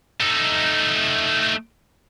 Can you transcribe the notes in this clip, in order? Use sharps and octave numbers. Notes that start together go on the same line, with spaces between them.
A3 D#4